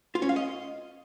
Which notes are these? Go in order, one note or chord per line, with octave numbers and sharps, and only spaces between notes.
F4
C#4
F5
D#5